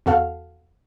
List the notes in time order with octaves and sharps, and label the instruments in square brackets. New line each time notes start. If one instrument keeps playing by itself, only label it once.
[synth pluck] E2 F#4 A4 F5 F6